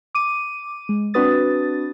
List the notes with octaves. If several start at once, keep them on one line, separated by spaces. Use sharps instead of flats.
D6 D#7
G#3
C4 D4 F#4 B4 D#6 A6